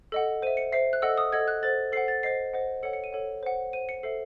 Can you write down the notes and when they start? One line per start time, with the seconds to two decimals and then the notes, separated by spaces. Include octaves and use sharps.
0.12 A4 D#5 F#5
0.42 C5 D#7
0.47 E5
0.57 C#7
0.73 C5 E5 C7
0.93 F#6
1.02 A4 D#5 F#5 E6
1.18 D#6
1.32 A4 D#5 F#5 G#6
1.48 F#6
1.63 A4 C5 F#5 A6
1.92 A4 C7
1.96 C5 F#5
2.08 A6
2.23 C5 D#5 F#5 C7
2.54 C5 D#5 F#5
2.83 A4 C#5 F#5 C#7
2.93 C#7
3.04 D#7
3.13 A4 C#5 F#5
3.43 C5 F#5
3.73 C5 F#5 D#7
3.89 C#7
4.03 A4 C5 E5 C7